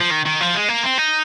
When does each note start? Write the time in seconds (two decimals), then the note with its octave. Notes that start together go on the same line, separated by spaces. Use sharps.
0.01 F3
0.11 D#3
0.26 D#3
0.41 F3
0.54 G#3
0.69 A#3
0.83 C4
0.98 D#4